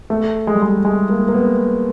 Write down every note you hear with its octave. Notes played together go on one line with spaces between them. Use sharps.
A3
G#3
G3
G#3
G#3
A#3
A#3
B3